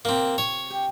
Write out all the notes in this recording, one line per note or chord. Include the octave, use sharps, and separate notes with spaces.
C3 A#3 C4 F4 G4
C#5
G4